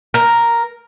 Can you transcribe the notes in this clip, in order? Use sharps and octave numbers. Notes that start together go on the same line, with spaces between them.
A#4